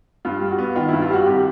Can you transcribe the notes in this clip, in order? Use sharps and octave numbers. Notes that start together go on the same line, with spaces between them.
G2 F4
G3
F#4
B3
D#3 F4
G2 E4
F4
G3 F#4
G#1 G4